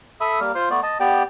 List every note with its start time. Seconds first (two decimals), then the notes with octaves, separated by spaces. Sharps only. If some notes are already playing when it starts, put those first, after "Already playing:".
0.21 A4 E5 B5 D#6
0.40 G3 A#3 A#4
0.55 F4 C5 C6
0.70 A3 B3 D5
0.83 D#5 A5
1.00 B3 G4 D5 G5